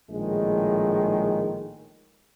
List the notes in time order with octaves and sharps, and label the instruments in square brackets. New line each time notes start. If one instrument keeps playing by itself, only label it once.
[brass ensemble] A#1 A2 D#3 G#3